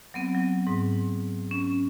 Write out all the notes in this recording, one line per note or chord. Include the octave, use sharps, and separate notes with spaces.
F#3 B3 C4
F#3
G#2
C#4